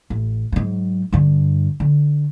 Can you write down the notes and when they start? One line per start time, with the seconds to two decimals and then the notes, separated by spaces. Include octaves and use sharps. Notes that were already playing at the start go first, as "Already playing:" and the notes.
0.10 A1
0.52 G#2 F#3
1.13 G2 D3
1.80 D3